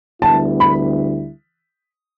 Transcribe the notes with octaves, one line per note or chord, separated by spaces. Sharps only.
D2 D3 G3 B3 E4 A5
B5